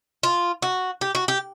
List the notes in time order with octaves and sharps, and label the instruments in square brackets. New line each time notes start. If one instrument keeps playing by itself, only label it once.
[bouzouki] F4
F#4
G4
F#4
G4